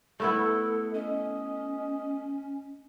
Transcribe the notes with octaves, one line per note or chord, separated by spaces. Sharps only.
A3 B3 E4 A4
C#4 D#5